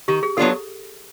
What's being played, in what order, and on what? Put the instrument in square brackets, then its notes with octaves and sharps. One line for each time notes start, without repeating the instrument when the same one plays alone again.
[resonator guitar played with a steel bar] D#3 [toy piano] G4
[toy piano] G#4
[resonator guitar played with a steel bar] F#3 B3 D4 F4 [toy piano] A4